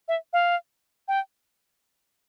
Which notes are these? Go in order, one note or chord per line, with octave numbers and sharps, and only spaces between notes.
E5
F5
G5